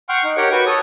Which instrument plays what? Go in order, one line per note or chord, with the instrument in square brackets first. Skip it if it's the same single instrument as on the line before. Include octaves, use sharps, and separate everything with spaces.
[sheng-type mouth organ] F#5 G5 C6 C#6 F6
D#4
G4 A#4 C#5 F#5 G5
F#4 B4 G5 C#6
A4 C#5 D#6